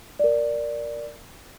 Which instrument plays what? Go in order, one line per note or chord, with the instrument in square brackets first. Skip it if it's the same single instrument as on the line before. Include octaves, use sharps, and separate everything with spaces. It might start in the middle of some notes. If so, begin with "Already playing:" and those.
[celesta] A#4 D5